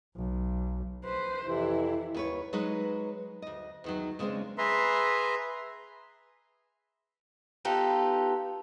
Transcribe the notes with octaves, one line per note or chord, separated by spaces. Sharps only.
B1
B4 C5
F2 C3 E3 E4
D#2 B4 C#5
F#3 G#3 D#4 B4
D2 D#5
E2 D#3 F#3
C#3 G#3 A3 B3 C4 D4
G#4 B4 E5 A#5 C6
B3 D#4 F4 G4 A4